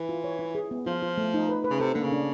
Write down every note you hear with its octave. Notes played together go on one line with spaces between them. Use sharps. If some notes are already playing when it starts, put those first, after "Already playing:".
Already playing: E3
F4
C#5
E4
G#4
B3
F3 F4
F4
A3
D#4
B4
B4
C#3
C3 A4
D3 A#3
C#3
D4